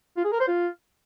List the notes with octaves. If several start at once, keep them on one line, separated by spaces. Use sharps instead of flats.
F4
G#4
A#4
C5
F4